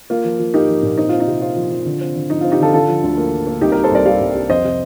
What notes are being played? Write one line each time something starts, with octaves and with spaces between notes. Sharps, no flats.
A#3 F4
F3
F3
A#3 D#4 G4
F3
A#2
C4 D#4
C4 F4
D#4
C3
C4 F4
F3
F3
D3
C4
D3
F3 D#4
F4
C4
D#4 G4
D3 F4 A4
D3 F4 A4
F3
D2
A#3
F3
A#3
C2 D#4 G4
G4 A#4
G3
A4 C5
C2 A#4 D5
G3 D5 F5
C2
C2
F2 C5 D#5
C3